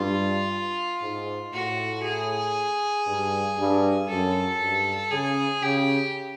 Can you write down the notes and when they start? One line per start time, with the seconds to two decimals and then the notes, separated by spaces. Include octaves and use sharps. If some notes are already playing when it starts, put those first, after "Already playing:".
Already playing: G2 F4
1.02 G#2
1.53 A2 F#4
2.04 G#4
3.07 G2
3.58 G2
4.08 F#2 A4
4.60 G2
5.11 C#3 G#4
5.62 C#3 G4